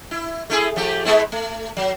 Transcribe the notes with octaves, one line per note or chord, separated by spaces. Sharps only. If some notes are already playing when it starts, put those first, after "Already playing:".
E4
A3 E4 G#4
F3 A3 G4
G#3 B3 E4
A3
F#3